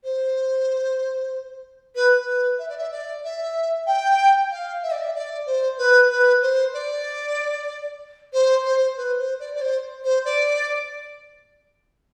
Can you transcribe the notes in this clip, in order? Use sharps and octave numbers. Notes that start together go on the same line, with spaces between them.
C5
B4
B4
E5
D5
E5
D5
E5
G5
F5
E5
D5
E5
D5
C5
B4
B4
C5
D5
C5
C5
B4
C5
D5
D5
C5
C5
D5